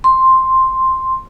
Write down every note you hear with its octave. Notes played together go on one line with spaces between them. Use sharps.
C6